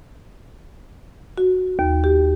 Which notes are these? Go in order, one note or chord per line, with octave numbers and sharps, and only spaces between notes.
F#4
D#2
G4